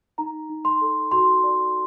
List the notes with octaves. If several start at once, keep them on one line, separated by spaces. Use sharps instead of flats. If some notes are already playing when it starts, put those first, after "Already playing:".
D#4 A#5
D#4
C6
A4
F#4 C6
D5